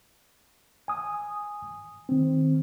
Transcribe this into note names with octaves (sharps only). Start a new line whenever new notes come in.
G#5 D#6
D#3 C4